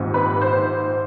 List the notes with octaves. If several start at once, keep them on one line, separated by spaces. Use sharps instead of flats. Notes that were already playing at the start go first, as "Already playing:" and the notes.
Already playing: A#1 G#2 D#3 G3 C4
B4
C5